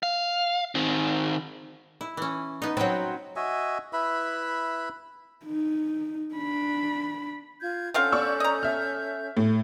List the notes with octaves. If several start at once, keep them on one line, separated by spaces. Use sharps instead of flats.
F5
D#3 C4
E4
E3 C#4
B3 D#4
F#3 C4 B4 G5
F#4 D#5 E5 G#5
E4 B4 E5 B5
D#4
D4 B5
F4 G6 G#6
D3 C4 C#4 A4 F5 G6
D5 C#6 E6
D#5 A#5
E5 F6
A2